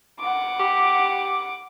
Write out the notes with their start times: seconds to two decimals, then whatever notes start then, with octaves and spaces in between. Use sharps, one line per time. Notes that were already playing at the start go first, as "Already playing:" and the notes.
0.19 F#5 D6
0.59 G4